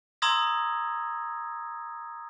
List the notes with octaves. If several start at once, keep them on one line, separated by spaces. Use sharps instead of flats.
A#5 C6 D#6 E6 G#6 A#6